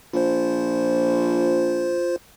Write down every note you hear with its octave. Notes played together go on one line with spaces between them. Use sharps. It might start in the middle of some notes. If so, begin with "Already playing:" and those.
A#1 F4 C5